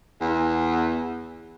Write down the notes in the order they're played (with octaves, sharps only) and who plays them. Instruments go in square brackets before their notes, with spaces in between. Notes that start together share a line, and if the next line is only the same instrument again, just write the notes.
[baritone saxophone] E2